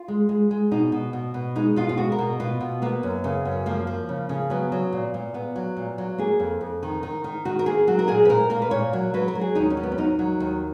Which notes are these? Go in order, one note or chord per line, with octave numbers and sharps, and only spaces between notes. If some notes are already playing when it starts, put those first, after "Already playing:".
Already playing: F4
G#3
G#3
G#3
B2 D#4
B2
B2
B2
G#3 D#4
B2 F4
F4
G#3 F#4
A#4
B2
B2 F4
B2
A#3 B3
F#2
C#3
F#2
F3 A#3
F3
C#3
C#3
F#3 B3
F#3
A#2
A#2
A#2 B3
F#3
A#2
F#3
A#3 G#4
F2
F2
D#3
D#3
D#3
D#3 F#4
A#4
A#3 G#4
F#3 F#4
A#4
A#2 G#4
B4
A#2 A#4
A#3 A#4
B4
A#2 C#5
F#3
F#3 B4
A#4
F#3
G#4
D#2 D#4
C#4
F#3
B3
C#4
D#2 D#4
F#3
D#2